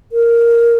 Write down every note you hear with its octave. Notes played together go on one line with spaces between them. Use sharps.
A#4